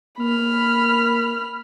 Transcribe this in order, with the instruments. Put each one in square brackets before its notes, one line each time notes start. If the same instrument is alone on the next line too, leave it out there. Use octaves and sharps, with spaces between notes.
[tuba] A#3 [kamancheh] B5 F6